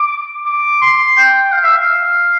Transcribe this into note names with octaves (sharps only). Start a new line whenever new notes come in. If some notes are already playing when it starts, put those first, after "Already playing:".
Already playing: D6
D6
C6
G5
F5
E5
F5